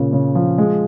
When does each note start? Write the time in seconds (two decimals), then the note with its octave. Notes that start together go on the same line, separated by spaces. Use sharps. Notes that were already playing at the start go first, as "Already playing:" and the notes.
Already playing: A#2 C#3 F4
0.13 C#3
0.35 F3
0.58 G#3